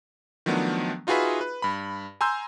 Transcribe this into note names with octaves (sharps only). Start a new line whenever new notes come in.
D#3 F3 F#3 A3 B3 D4
D#4 F4 F#4 G#4 B4 E5
B4
G2 B5
G#5 A#5 C6 E6 G6